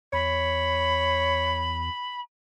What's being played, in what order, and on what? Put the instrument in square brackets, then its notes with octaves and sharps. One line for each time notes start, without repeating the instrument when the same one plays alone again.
[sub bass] E2 [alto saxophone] C#5 [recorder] B5